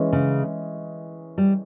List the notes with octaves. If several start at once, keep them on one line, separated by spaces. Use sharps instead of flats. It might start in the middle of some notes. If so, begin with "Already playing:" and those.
Already playing: E3 G#3 C#4 D#5
C#3
G3